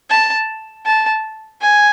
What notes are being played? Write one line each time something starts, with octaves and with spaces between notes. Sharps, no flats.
A5
A5
G#5